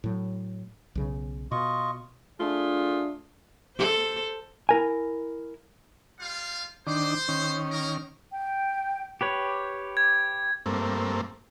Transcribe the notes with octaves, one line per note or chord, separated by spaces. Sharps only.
A2 F#3
B1 C#3
B2 F4 D#5 C#6
A3 D4 F4 G#4
A4 C5
E4 A#4 G#5
G3 F4 F5
D#3 D4 C5
D#3 C#4
A#3 A#4
G5
G4 B4 C#5
G#6
G2 A3 A#3 C4